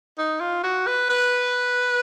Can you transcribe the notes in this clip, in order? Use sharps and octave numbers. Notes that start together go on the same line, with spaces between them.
D#4
F4
F#4
B4
B4